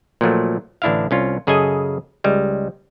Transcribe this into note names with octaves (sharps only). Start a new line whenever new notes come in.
A#2 F3 F#3 A3
A1 D3 D4 E4 E5 F5
C2 C#4 F4
F#2 C#3 G#4 A4 D#5 G#5
C#2 G3 G#3